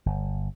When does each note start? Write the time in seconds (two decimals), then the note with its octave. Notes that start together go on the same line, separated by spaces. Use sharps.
0.06 G1